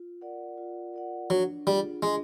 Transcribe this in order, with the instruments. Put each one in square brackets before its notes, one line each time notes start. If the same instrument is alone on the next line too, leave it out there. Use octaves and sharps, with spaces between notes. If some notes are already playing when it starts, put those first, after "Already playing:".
Already playing: [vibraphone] F4
A#4 D5 F#5
F4
A#4 D5 F#5
[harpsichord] F#3 [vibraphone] D4
[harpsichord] G3 [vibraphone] F4 G#4
[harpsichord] G#3 [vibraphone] D4